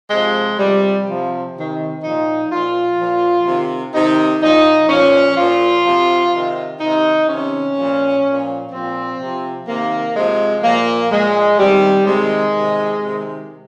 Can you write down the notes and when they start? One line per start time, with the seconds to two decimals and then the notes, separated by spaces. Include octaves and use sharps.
0.10 C3 F3 G#3
0.58 C3 F3 G3
1.06 C3 F3
1.55 C3 D#3
2.02 A#2 F3 D#4
2.49 A#2 F3 F4
2.97 A#2 F3
3.46 C3 D#3
3.93 C3 D#3 D#4
4.41 A#2 F3 D#4
4.89 A#2 F3 C#4
5.37 A#2 F3 F4
5.84 C3 F3
6.32 C3 D#3
6.80 C3 D#3 D#4
7.28 C3 D#3 C#4
7.76 A#2 F3
8.24 A#2 F3
8.72 A#2 F3 C4
9.19 C3 F3
9.67 C3 D#3 A#3
10.15 C3 F3 G#3
10.63 A#2 F3 A#3
11.10 A#2 F3 G#3
11.58 C3 D#3 G3
12.06 C3 D#3 G#3
12.55 C3 D#3
13.03 C3 D#3